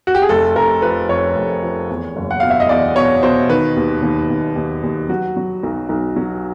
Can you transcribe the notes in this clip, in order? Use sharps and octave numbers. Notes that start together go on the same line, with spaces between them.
F#4
G4
G#4
F1 A4
F1 A#4
F3 B4
F2 C#5
F1
F3
E2
F#1
F#5
B2 F5
E5
D#5
E2 D5
B2 C#5
B2 C5
D#3 B4
D#2
D#2
D#2
D#2
D#2
F#3 F#4
F#3
B1
B1
F#3